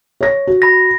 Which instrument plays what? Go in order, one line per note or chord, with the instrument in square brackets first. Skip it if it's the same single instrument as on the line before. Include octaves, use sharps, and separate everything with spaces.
[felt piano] C#5 A#6
F#4
[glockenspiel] B5 A#6